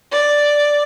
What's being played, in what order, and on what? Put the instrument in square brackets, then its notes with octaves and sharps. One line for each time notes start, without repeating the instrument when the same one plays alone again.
[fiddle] D5